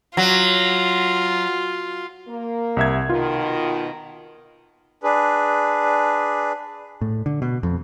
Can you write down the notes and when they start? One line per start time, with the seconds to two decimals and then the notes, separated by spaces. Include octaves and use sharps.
0.17 F#3 F4
2.28 A#3
2.77 C2 E5 G#6
3.09 B2 D#3 F4
5.03 D4 G#4 B4
7.01 A2
7.26 D3
7.42 B2
7.63 F2